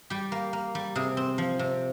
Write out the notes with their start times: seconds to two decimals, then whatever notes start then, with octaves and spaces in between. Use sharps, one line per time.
0.10 G3 G4
0.32 A#3
0.53 A#3
0.75 G3
0.95 C3 G#4
1.17 C4
1.38 F3
1.59 C3